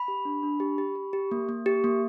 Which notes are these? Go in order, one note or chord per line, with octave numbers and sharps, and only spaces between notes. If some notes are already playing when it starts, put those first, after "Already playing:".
Already playing: B5
G4
D4
D4
G4
G4
G4
G4
A#3
A#3
G4
A#3